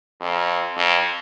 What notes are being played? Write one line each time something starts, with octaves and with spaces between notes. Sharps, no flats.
F2
F2